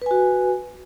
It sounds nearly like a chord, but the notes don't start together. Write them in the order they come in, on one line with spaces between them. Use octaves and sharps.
B4 G#5 F#4